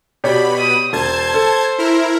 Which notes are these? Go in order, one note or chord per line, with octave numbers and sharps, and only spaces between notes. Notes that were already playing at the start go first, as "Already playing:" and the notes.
B2 G4 C#5 D5 B5
D#6
E1 C5 A5 G#6
A4
E4 A#4